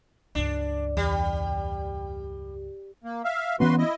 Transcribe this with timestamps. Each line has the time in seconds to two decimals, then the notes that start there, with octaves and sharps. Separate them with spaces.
0.35 C#2 G2 D4
0.97 E2 G3
3.04 A#3
3.24 E5 F5
3.60 E3 B3 C#4 F#4 B4 C6
3.78 E4 D#5